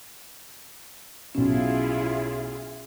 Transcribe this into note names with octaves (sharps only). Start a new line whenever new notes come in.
B1 B2 C#4 E4 F4 G#4